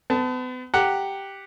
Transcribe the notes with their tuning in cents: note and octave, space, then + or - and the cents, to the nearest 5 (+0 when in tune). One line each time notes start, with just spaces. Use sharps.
B3 +40 A5 +0
G4 +0 F#5 +0 A#5 -10